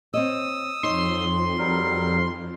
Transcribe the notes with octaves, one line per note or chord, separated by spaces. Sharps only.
C4 C#5 D#5 D#6 E6
F2 D#4 C#5 C6
F#3 G3 A#4